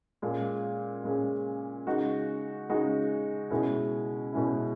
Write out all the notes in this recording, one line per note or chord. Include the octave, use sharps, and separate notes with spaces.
A#2 G#3 C#4 G#4
A#2 G#3 C#4 G#4
C#3 G#3 D#4 F#4
C#3 G#3 D#4 F#4
B2 G#3 C#4 E4
B2 G#3 C#4 E4